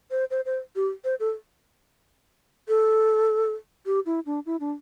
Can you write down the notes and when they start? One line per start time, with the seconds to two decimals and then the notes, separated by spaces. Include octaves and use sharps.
0.11 C5
0.31 C5
0.46 C5
0.76 G4
1.05 C5
1.20 A4
2.68 A4
3.86 G4
4.06 E4
4.26 D4
4.46 E4
4.60 D4